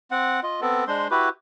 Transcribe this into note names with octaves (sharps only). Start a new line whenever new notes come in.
C4 F#5
F4 D#5
B3 C4 A4
G#3 D4 C5 C6
E4 F#4 G4 B4